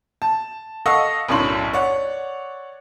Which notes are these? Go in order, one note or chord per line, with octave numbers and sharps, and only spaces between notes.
A5
A4 D#5 F5 F#5 C#6 E6
B1 F#2 A2 D4 C6 F#7
C#5 D5 F#5